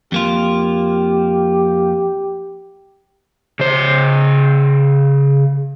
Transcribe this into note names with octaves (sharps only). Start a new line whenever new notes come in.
F2 A#3 F4 G4
C#3 C5